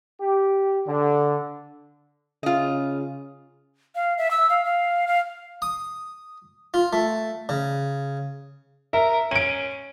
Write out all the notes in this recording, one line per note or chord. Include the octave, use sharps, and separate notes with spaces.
G4
D3
C#3 F4 D#5
F5
E5
E6
F5
F5
F5
D#6
F4
A3
C#3
A#4 E5
C#4 D7 D#7